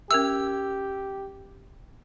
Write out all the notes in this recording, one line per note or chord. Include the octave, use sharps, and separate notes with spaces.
C#4 G4 A#4 E5 E6